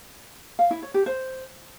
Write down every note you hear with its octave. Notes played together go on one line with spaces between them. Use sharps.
F5
E4
C#5
G4
C5